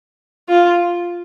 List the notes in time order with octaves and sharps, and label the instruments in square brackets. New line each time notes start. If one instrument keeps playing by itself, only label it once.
[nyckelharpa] F4